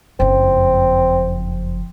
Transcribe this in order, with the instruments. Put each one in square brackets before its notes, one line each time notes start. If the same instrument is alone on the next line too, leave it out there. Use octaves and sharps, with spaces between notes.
[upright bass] F#1 F2 [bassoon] C4